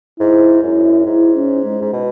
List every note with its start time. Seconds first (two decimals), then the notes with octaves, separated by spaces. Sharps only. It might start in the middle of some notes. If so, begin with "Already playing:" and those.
0.19 G#2 E4
0.63 F#2 E4
1.06 G#2 E4
1.36 C#4
1.64 G#3
1.82 G#2
1.93 B2